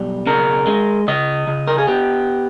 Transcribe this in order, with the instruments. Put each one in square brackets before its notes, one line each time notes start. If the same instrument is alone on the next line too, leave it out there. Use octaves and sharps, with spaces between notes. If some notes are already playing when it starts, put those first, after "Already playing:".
Already playing: [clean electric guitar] B1 G3
C#3 A#4
G#3
C#3 D#5
C#3
A#4
G#4
B3 G4